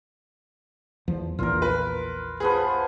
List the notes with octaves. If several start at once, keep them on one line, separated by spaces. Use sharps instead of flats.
E2 F3
A#1 E2 A#2 F4 A#4
B4
F3 B3 G#4 B4